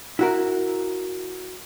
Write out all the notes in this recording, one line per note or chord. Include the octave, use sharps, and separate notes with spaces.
E4 F#4 A#4